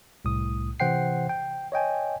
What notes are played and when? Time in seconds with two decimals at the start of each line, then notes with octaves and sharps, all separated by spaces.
0.25 C2 A2 D#6
0.80 C3 E3 C5 F#5 G5 C7
1.29 G5
1.72 C#5 D#5 G5 G#5